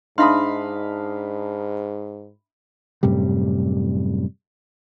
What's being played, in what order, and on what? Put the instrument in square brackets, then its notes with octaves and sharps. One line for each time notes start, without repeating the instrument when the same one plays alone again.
[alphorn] G#2 [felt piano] D4 D#4 [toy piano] E5 C6 [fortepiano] F5 B5 D#6
[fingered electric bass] F#2 A2 C3 G3